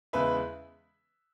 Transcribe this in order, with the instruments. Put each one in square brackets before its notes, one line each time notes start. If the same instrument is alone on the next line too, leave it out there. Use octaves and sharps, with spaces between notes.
[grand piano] E2 C#3 G#3 B4 E5